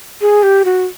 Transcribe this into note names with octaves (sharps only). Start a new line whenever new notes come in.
G#4
G4
F#4